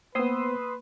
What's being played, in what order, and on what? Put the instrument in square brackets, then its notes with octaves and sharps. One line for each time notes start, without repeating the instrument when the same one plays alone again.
[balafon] A#3 [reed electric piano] B3 C5 [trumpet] B4 [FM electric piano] C6 D#6 E6